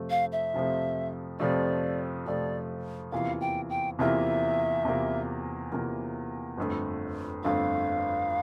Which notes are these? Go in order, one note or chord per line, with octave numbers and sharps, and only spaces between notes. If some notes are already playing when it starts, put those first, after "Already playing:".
Already playing: F2 C3 F3 A3
F5
E5
F2 C3 F3 A3
F2 C3 F3 A3 D5
F2 C3 F3 A3 D5
E2 C3 E3 A#3 F4 F5
G5
G5
E2 C3 E3 A#3 F4 E5
E2 C3 E3 A#3 F4
E2 C3 E3 A#3 F4
G1 F2 D3 A3
G1 F2 D3 A3 F5